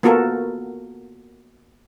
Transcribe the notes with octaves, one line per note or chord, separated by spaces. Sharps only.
A#3 B3 F4 F#4 A4 A#4